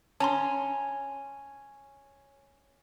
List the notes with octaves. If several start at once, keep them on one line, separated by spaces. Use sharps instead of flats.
C#4 A5 A#5 C6